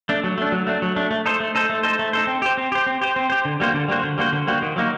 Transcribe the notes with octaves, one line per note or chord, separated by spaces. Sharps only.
A3 D4
F#3
A3 D4
F#3
A3 D4
F#3
A3 D4
A3
D#4 A4 C5
A3
D#4 A4 C5
A3
D#4 A4 C5
A3
D#4 A4 C5
C4
G4 C5
C4
G4 C5
C4
G4 C5
C4
G4 C5
D3
G3 A#3 F#4 C5
D3
G3 A#3 F#4 C5
D3
G3 A#3 F#4 C5
D3
G3 A#3 F#4 C5
D#3
F#3 A#3 D#4 F#4